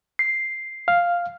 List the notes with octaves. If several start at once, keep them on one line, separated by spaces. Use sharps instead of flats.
C7
F5